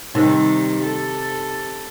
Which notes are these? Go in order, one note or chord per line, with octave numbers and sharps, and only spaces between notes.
C3 D#3 G3 D#4 A#4 C5
A4